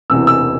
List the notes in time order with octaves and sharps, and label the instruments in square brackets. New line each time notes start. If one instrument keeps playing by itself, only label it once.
[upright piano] E1 E2 C3 E3 E6
E6